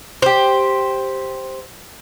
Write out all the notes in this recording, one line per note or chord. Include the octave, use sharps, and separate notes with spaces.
G4 C5